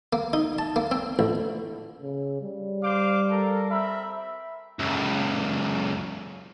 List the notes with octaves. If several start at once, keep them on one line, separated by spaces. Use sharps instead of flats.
A#3
D#4
A5
A#3
C4
A1
C#3
G3
C5 F5 D6
A4 A#4
C4 A#4 E5 B5
C#2 F#2